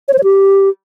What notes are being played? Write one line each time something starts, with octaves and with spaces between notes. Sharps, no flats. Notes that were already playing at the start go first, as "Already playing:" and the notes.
C#5
C5
C#5
G4